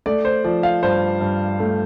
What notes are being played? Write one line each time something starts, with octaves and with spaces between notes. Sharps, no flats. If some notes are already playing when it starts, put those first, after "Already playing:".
A3 D5
C5
F3 D5
F5
G2 C5
G2
A3